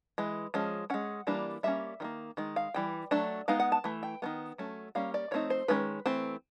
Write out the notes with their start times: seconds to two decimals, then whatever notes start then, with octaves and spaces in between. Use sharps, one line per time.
0.18 E3 G#3
0.54 F3 G#3 C#4
0.90 G#3 C#4 F#5
1.27 E3 G3 A#3 D4
1.63 G3 A#3 C#4 E5
2.00 D#3 G3 A#3
2.37 D#3 G#3
2.56 F5
2.74 E3 G3 G5
3.11 F#3 A3 D4
3.48 G#3 B3 D#4 F5
3.60 F#5
3.72 A5
3.84 E3 A3
4.03 G5
4.22 D#3 G#3 B3
4.58 F#3 A3 C#4
4.95 G3 A#3 C#4 F5
5.14 D5
5.31 F3 A3 C4 D#4 C#5
5.50 C5
5.68 D#3 G#3 C#4 B4
6.06 E3 A3 C4